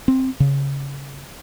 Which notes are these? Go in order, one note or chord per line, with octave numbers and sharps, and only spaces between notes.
C4
C#3